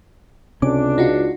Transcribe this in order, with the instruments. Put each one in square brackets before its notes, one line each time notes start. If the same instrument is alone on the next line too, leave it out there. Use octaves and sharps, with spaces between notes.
[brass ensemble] C#2 D4 [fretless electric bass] C3 C#4 [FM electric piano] D6
[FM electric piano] D#4 F4 F#4